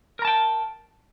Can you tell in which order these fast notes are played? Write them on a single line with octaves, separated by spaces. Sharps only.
A#4 A#5 A5 G5